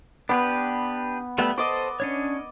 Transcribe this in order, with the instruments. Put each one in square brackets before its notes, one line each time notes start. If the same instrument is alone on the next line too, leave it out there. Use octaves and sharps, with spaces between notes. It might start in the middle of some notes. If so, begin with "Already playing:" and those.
[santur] B3 [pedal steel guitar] D4 G4 B4
[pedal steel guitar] G3 A3 B3
[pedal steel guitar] A4 C5 D6 [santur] D5 D#5
[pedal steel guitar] C#4 D4 C#5